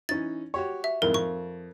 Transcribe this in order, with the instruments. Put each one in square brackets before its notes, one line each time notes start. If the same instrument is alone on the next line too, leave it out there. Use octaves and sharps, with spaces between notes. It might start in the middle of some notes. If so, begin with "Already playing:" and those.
[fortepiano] E3 C#4 D#4 [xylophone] A6
[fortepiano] F#4 G4 C#5
[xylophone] E5
[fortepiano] G#1 F2 E3 [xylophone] A#4
[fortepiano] F2 [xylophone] C#6